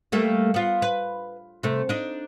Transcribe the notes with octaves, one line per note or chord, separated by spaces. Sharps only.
G3 A3 A#3
B3 F4
B4
C3 A3
D4 D#4